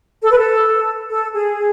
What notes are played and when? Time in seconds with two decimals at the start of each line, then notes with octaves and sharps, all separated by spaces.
0.22 A4
0.31 B4
0.38 A4
1.12 A4
1.34 G#4